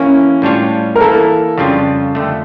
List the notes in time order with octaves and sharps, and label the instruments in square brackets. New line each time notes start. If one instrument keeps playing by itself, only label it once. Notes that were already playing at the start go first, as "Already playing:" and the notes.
Already playing: [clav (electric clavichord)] E3 A#3 E4 [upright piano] C#4
[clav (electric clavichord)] A2 G3 D4 F4 C#5
[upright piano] A#4
[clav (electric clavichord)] E3 A#3 E4 [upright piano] A4
[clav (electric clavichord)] F2 C#3 G3 D4 F4
F2 D3 A3